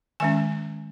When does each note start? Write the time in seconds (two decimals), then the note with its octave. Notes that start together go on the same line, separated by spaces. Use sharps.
0.20 D#3 G#3 C#4 G#5